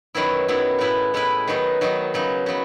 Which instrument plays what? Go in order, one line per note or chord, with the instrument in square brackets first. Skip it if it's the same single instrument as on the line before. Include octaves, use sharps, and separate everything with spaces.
[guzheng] F#2 D#3 F#3 B3 E4
F#2 D#3 F#3 B3 E4
A2 G#3 B3 E4 B4
A2 G#3 B3 E4 B4
D#3 F#3 B3 D#4
D#3 F#3 B3 D#4
C#3 F#3 B3 D#4
C#3 F#3 B3